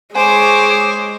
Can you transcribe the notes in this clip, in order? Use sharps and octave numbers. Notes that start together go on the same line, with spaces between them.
G#3 C5 C#5 G#5 D6